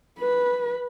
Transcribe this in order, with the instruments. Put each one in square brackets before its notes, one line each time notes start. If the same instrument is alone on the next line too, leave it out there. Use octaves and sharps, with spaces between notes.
[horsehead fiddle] B4